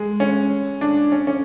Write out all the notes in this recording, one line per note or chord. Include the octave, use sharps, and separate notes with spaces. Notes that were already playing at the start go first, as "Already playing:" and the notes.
Already playing: G#3
C#4
D4
C#4
C#4